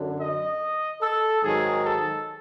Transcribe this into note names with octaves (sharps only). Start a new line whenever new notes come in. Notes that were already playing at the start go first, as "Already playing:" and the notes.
Already playing: F#2 D3 F#3
D#5
A4
G#2 D#3 F#3 G#4
A4